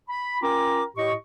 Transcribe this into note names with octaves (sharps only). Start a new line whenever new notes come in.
B5
C#4 F4 A#4 G5 A#5 D6
A2 G4 D#5 C#6